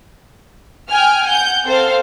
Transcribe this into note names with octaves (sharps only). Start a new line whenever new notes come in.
G5 G#5 F6
F#5 G6
C4 A4 C5 F5